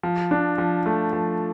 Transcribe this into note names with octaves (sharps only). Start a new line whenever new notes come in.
F3
D4
F3
A3
F3